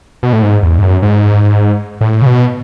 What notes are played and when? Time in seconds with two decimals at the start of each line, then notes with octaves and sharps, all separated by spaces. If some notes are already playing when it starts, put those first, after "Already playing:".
0.23 B2
0.33 A2
0.43 G#2
0.63 E2
0.78 G#2
0.83 F#2
1.02 G#2
2.01 A2
2.22 C#3
2.27 B2